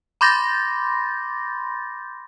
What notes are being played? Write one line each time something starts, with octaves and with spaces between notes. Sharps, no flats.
B5 C6 D6 G6 A6 A#6